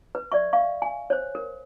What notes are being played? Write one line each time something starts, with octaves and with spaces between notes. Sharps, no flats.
B4
D5 E5 C#6
E5 F5 C#6
G#5
C5 C#5
A#4